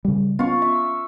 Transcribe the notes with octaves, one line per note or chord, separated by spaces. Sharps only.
C#3 G3
B3 C#4 F4 C#6
E5